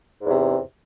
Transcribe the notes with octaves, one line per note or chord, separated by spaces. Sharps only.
E2 G#2 C3